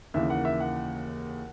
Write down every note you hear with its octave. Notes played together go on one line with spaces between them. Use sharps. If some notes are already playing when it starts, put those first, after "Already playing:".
D#2 C#3 E3 A#3 E5
F#5
E5
F#5